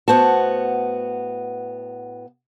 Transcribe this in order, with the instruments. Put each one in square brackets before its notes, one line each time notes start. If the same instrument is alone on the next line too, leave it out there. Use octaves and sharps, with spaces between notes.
[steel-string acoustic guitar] A2 B3 F#4 [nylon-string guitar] C5 A5